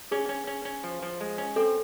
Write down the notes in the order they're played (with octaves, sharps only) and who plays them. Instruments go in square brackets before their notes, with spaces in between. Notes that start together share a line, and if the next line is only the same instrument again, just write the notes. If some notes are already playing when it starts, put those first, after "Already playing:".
[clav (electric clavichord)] C#4 [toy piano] G#4
[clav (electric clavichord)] C#4
C#4
C#4
F3
F3
G#3
C#4
[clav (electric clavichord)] C4 [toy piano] A4